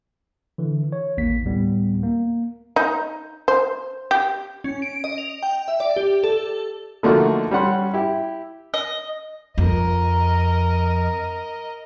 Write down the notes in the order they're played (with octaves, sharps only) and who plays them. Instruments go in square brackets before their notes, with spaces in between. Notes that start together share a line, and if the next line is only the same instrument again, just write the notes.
[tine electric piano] D3 E3
C#5
A1 D#2 A#3 B6
D2 A2 G3 B3
A#3
[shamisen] D#4
C5
G4
[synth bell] C#4
D7
D#5
F7
G5
E5
D5
G4
A4
[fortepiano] D3 F3 A3 A#3 D#4 F#4
G3 C#4 F#5 C6
E4 G4
[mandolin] D#5
[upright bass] F2 [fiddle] A#4 D#5